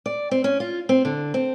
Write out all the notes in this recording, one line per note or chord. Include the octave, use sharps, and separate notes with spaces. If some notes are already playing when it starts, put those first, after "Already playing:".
D5
C4
C#4
F4
C4
D3
C4